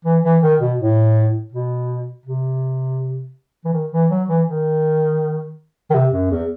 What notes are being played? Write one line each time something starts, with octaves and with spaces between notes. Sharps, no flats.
E3
E3
D#3
B2
A2
B2
C3
E3
D#3
E3
F#3
E3
D#3
D#3
C3
F#2
E2